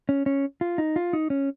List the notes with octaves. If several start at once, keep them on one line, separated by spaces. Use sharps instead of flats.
C#4
C#4
F4
D#4
F4
D#4
C#4